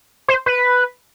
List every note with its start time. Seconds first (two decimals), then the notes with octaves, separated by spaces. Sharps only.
0.28 C5
0.46 B4